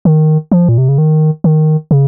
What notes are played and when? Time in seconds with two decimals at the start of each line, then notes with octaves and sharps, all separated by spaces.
0.05 D#3
0.52 F3
0.69 A#2
0.78 C3
0.89 C#3
0.98 D#3
1.44 D#3
1.91 C#3